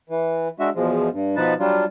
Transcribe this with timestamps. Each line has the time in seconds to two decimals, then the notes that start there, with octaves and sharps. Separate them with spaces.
0.10 E3
0.60 G#3 D4 F#4 E5
0.76 E2 B2 F3 G#3
1.13 G2
1.36 B2 F3 D#4 B4 A5
1.59 F#3 G3 D4 F4